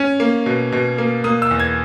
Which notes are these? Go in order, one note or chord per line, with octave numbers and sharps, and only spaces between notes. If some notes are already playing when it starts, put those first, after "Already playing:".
Already playing: C#4
A#3
B2
B2
A#3
A#3 D#6
E6
E2
G#6